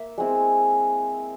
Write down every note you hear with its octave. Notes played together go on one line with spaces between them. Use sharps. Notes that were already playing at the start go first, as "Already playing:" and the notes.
Already playing: A#3 E5
G#3 C4 E4